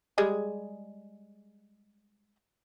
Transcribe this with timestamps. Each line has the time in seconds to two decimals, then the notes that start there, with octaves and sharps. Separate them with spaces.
0.18 G3 G#3 G#4